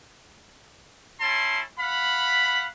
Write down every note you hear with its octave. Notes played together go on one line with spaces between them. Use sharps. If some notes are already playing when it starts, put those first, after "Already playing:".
C#4 E4 A5 C6
F5 F#5 B5